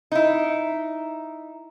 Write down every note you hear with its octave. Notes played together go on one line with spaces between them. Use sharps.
D#4 E4